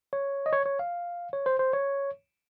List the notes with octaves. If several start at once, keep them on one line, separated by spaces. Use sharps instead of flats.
C#5
D#5
C#5
C#5
F5
C#5
C5
C5
C#5